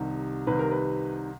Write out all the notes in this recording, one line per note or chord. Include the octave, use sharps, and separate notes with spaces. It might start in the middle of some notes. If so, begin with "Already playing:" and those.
Already playing: C2 C3 D#3
C2 C3 D#3 B4
A#4
B4